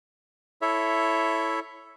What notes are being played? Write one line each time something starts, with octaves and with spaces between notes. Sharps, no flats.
E4 A4 C#5 E5